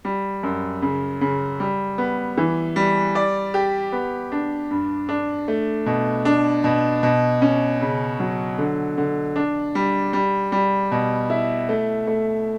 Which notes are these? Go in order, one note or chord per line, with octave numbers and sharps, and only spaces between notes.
G3
F#2
C#3
C#3
G3
B3
E3
G3
D5
G4
B3
D4
G2
D4
A3
B2
D4
B2
B2
C#4
C#3
F#3
D3
D3
D4
G3
G3
G3
B2
E4
A3
A3